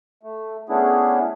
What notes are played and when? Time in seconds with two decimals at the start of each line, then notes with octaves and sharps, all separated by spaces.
0.23 A3
0.69 A3 B3 C#4 D4 E4 G#4